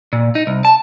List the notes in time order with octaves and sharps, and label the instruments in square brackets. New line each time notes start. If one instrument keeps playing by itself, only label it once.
[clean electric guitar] A#2
D#4
C2
A5